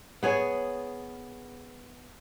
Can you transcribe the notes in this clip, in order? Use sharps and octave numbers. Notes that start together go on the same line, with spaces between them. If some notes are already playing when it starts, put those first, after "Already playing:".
B3 G#4 C#5